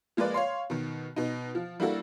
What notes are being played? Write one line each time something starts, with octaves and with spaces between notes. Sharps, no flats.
F3 G#3 A#3 B4 D5
C#5 F5 C6
B2 D#3
B2 D#4
F3
G3 A#3 D4 E4 F#4 A4